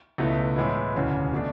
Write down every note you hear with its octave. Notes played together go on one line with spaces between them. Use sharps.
C#2 B2 A3 E4 B4
A2 E3 G#3 B3 E4
E1 D2 C#3 E3
B2 A3 D4